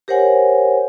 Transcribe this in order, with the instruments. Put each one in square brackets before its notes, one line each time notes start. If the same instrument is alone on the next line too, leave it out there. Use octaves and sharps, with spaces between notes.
[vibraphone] G4 A#4 C5 C#5 F#5 G#5